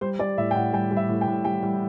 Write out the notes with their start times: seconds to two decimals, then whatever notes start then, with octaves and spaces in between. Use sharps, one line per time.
0.01 G3 C5
0.19 G3 D5
0.38 A2 E5
0.51 G5
0.55 A2 F#5
0.73 G3 G5
0.91 G3
0.97 E5
1.09 A2
1.21 G5
1.27 A2
1.45 G3 G5
1.63 G3